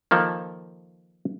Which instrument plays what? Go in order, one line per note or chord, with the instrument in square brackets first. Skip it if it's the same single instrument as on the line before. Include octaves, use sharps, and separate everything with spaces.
[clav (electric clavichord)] D#3 F3 A#3 A4